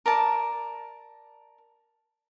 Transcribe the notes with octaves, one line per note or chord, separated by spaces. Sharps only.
A#4 D5 A5